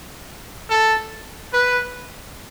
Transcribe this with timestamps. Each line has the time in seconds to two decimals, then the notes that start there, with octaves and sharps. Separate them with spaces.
0.70 A4
1.54 B4